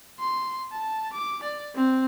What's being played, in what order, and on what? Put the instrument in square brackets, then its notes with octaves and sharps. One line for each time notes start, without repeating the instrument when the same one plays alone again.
[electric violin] C6
A5
D6
D5
C4